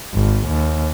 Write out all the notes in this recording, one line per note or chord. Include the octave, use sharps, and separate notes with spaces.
G#1
D#2